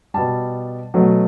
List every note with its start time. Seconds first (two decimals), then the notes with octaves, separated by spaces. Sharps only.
0.14 B2 G3 A5
0.94 B2 F#3 A3